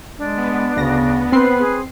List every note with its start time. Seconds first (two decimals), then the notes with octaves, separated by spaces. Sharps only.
0.18 G#3 D4
0.38 B3
0.76 D2 C#3 A#6
1.32 C4 B4 C6 C7
1.59 G#4